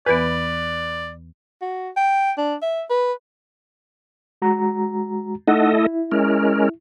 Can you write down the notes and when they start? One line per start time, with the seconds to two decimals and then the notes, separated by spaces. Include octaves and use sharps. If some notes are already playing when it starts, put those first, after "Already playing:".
0.06 E2 E3 B3 B4 D5
1.62 F#4
1.97 G5
2.37 D4
2.62 E5
2.90 B4
4.42 G#3 F#4 A#5
5.48 A3 D#4 E4 A4 D#5 F#5
5.73 E4
6.11 G#3 C#4 A#4